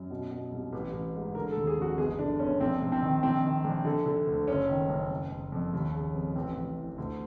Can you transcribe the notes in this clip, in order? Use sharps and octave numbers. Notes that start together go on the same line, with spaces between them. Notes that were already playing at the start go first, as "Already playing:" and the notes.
Already playing: F#2
B2
B2
C2
A1
A1
G#2
D3 A#4
A4
D#2
G#4
F1 F#4
G1 G#4
D3 D4
G1 C#4
A#1 C4
A#1
C4
D#3
A#1 C4
D#3
A#1
D3
D3
D2
F#1 C#4
D#3
F#1
F#1
F#1
F2
D#2
C#3
F1
A1 C4
A1
E3
D2